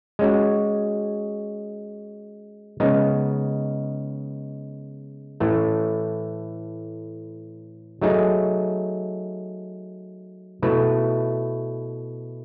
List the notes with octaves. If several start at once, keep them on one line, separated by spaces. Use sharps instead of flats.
G#3 C#4 F#4
C#3 G#3 B3 D#4
A2 E3 A3
F#3 A3 D#4 G#4
B2 A3 E4 B4